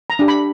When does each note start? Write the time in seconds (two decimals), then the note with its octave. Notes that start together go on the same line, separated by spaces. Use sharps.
0.10 A#5
0.19 D4 G4
0.28 B5